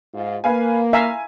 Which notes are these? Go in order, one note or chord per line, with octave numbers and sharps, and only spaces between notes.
G#2 F4
A#3 B4 F5 G#5
E5 F5 G#5 A#5